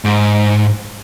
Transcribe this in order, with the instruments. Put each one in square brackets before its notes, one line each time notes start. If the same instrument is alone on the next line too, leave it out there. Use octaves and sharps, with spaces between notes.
[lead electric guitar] G#2